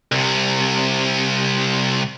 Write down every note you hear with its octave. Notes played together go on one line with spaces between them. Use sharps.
C2 C3